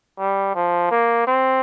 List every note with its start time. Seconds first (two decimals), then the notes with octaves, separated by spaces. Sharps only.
0.18 G3
0.55 F3
0.91 A#3
1.27 C4